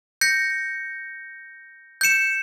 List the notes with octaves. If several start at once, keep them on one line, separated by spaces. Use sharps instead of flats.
G6 A#6 C#7
G6 C#7 E7